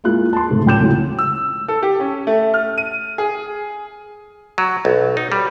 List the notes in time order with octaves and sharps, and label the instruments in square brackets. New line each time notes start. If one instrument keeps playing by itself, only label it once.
[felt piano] G#3 A#3 E4 F4 F#6
A5 C6
G#2 C3 A3
C#2 C#4 G5 D6 G6 E7
C#3 E3 F#3 G#3 A3 C#4
[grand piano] E6
A4
G4
C#4
A3
F6
D#7
G#4
[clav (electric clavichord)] F#3
B1
D#4
G3